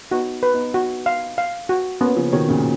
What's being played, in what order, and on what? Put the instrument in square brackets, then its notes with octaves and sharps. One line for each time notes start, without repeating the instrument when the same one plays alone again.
[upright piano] B3 D#4 [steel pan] F#4
[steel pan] B4
[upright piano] B3 D#4
[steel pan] F#4
F5
F5
F#4
[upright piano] A#3 C#4 [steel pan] B3
[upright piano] C#3 F3
[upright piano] B2 D#3 [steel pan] C#5
[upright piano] A#2 C#3